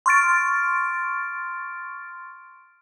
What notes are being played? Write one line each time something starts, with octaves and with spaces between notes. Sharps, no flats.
C6 C#6 F6 A6 D7